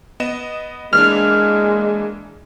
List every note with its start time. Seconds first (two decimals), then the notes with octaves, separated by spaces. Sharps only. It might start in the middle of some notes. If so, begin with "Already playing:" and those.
0.20 B3 D#5 E7
0.93 E3 G#3 A#3 D4 F6